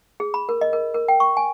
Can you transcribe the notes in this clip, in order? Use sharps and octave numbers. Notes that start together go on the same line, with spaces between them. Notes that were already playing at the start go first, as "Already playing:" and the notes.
G#4
B5
A#4
D#5
A#4
A#4
G5
C#6
G#5